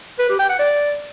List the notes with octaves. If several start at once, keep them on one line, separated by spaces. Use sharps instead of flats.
B4
G4
G5
F#5
D5